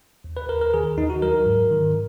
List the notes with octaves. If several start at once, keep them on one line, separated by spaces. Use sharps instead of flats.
D#2
B4
D#2 A#4
A#4
D#3 G#4
D#2 D#4
F#4
F#3 A#4
G#2
D#3